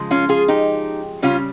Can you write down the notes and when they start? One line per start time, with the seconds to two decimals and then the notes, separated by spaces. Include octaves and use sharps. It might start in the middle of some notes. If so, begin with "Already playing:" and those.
Already playing: C#3 F3 G#3
0.11 C#4 F4
0.29 F4 G#4
0.48 D#4 G4
1.22 C#3 G3 C#4 F4